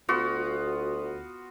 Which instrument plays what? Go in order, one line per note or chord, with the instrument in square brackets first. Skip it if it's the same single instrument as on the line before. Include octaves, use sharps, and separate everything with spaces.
[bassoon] D2 [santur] B3 F4 F#4